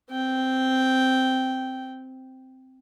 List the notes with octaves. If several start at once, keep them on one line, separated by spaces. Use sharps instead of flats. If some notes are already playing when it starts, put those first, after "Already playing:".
C4 G5